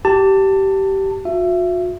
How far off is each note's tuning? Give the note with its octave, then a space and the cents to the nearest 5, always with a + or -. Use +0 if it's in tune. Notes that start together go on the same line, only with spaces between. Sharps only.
G4 -20 A5 +20
F#4 -45 E5 +25